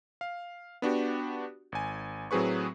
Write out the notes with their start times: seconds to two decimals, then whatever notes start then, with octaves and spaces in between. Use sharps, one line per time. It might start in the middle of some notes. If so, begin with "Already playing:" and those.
0.21 F5
0.82 B3 D4 F#4 G4
1.72 G#1 G#5
2.31 A2 F#3 C4 G#4 B4 C#6